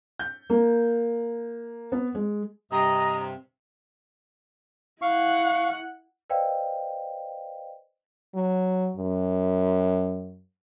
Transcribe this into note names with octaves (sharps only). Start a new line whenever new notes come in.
G6
A#3
B3
G#3
G2 C3 D#5 A#5
E4 F5 F#5 C#6
B4 C5 D5 D#5 F5 G5
F#3
F#2